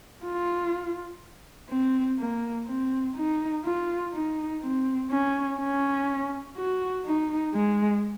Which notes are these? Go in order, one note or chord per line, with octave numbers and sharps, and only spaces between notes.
F4
C4
A#3
C4
D#4
F4
D#4
C4
C#4
C#4
F#4
D#4
G#3